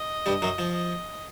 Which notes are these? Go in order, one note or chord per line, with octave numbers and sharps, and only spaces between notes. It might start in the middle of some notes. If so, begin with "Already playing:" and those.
Already playing: D#5
G2 G3
F#2 F#3
F3
D#5